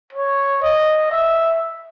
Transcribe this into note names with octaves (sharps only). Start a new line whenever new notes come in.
C#5
D#5
E5